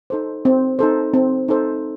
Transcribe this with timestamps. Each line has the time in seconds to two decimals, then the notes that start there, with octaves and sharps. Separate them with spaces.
0.10 D#4 A4 C5
0.45 C4
0.79 D#4 A4 C5
1.14 C4
1.48 D#4 A4 C5